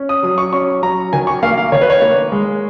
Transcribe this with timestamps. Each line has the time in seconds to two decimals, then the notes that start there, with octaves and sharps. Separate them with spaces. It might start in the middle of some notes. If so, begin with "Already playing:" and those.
Already playing: C#4
0.09 D#6
0.23 F#3 D#6
0.38 C#6
0.53 C#4 C#6
0.82 F#3 A#5
1.13 D#3 G#5
1.27 C#6
1.43 A#3 F5
1.58 F5
1.72 D#3 C#5
1.81 B4
1.90 C#5
2.02 A#3
2.32 G#3